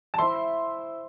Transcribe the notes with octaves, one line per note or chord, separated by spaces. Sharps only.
A5
E4 C5 E5 C6